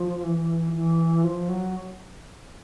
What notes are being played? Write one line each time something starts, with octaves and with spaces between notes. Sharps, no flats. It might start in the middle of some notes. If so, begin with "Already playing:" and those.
Already playing: F3
E3
E3
F3
F#3